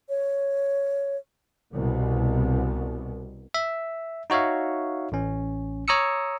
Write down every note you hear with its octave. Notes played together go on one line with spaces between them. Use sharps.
C#5
C2 B2
E5
D#4 F#4 C#5 E5 F5
A1 C#4
C#5 A#5 D#6 E6 C#7